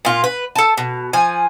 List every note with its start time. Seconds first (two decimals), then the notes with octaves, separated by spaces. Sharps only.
0.05 A#2 F4
0.24 B4
0.56 A4 A5
0.77 B2
1.13 F3 G#5